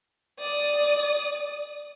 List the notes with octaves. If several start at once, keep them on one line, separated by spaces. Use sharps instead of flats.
D5 D#6